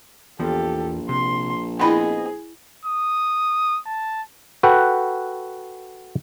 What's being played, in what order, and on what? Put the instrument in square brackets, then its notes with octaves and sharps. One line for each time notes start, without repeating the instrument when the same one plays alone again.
[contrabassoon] A#1 [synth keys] E2 F3 [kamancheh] G4 A4
[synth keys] C3 [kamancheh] C6
[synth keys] B3 C4 D#5 [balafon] E4 B5 C6 [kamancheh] G#4
[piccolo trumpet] D#6
A5
[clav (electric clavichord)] F#4 A4 B4 F#5 G5